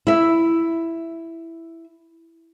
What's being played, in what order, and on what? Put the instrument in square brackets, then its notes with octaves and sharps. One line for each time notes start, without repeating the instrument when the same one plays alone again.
[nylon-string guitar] E4 E5